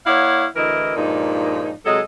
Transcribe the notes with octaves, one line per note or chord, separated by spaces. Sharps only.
A#3 E4 C#5 D5 F5 F#5
D2 E3 E4 A#4 D#5
G2 A#2 F3 G#3 D#4
C3 F#3 G#3 G#4 A4 D#5